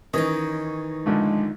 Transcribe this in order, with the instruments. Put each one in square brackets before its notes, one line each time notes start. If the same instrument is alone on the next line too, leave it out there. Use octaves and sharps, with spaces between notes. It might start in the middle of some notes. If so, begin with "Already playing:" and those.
[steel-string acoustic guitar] D#3 D#4 [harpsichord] E3 C#5 D#5 [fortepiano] C#4
[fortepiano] A#1 D3 A3 [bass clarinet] G#3